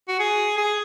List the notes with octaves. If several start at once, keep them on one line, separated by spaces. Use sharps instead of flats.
F#4
G#4
G#4